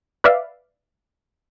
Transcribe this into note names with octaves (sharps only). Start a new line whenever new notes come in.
B4 D5 E5 F5